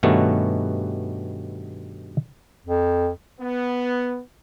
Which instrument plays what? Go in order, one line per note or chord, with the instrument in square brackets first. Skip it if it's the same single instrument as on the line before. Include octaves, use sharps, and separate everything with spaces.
[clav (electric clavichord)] G2 B2 D#3 A3 B3 C#4
[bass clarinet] F2
[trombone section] B3